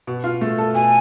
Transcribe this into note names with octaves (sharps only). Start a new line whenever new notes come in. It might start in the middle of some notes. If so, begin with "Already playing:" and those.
B2
F4
A3
A4
B2 G#5